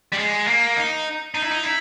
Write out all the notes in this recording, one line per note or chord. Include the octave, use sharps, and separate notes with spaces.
G3
G#3
A#3
D#4
D#4
E4
D#4
E4